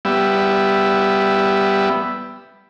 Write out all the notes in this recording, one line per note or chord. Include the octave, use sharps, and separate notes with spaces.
G3 B3 E5